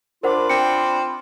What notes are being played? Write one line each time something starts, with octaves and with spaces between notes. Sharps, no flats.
D4 F4 A#4 C5 F#5 B5 D6
C4 C#7